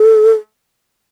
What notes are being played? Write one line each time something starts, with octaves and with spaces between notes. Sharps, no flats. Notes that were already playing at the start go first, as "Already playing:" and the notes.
Already playing: A4